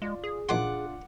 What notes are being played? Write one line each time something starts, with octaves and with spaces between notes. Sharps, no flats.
G#3 F4 D5
G#4
A#1 D#3 D4 F4 F#5 C6 D6